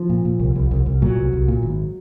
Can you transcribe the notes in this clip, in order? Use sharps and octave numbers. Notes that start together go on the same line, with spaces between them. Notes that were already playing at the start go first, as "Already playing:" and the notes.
Already playing: F3
A#2
A#2
C2
C2
C2
C2
A#2 F#3
C2
C2
A#2
G#1